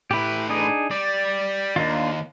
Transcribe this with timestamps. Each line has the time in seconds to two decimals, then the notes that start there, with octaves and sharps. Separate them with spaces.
0.11 A2 E4 G4 B4
0.50 D4 D#4 G#4
0.91 G3 D5
1.76 D#2 A#3 D4 F4